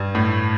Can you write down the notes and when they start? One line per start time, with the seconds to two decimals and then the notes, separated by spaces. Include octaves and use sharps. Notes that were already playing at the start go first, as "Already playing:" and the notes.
Already playing: G2
0.15 A2